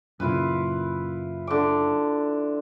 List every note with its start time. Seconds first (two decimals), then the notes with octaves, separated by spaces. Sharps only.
0.20 F#2 A#2 C#3 E4 F4 B4
1.47 D3 D6